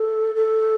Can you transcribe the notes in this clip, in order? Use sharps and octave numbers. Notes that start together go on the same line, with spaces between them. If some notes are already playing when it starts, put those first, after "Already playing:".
Already playing: A4
A4